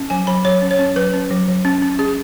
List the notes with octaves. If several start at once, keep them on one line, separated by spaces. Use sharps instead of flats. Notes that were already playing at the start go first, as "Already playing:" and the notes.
Already playing: C#4
F#3 G#5
F#3 B5
F#3 C#5
C#4
C#5
C#4
F#3 B4
C#4
F#3
F#3
C#4
C#4
C#4 G#4